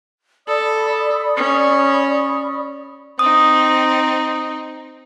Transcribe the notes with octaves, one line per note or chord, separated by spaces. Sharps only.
A4 D5 B5 D#6
C#4
C4 D#4 D#6